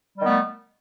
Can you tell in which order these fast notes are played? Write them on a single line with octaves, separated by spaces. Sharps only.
G3 D#3 B3 A3